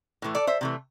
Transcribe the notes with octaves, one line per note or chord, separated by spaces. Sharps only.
A2 E3 A3
A4 D5
C5 E5
C3 E3 A3